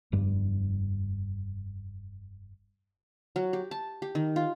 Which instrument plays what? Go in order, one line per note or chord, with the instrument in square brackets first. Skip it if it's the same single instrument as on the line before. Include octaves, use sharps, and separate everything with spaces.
[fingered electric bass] F1 G2 G3
[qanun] F#3
G4
A5
G4
D#3
F4